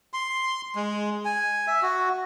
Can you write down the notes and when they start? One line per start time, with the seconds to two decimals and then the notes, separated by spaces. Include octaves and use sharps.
0.13 C6
0.75 G#3
1.25 G#5
1.67 E5
1.82 F#4